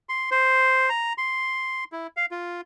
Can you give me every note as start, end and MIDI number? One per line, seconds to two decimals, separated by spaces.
0.09 0.30 84
0.31 0.89 72
0.89 1.13 82
1.18 1.84 84
1.92 2.07 64
2.17 2.26 77
2.31 2.61 65